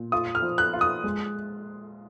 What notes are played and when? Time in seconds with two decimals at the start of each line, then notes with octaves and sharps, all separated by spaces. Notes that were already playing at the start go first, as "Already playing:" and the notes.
Already playing: A#2
0.12 F4 D#6
0.35 F6
0.42 F3
0.58 F#6
0.73 F4
0.81 D#6
1.04 G#3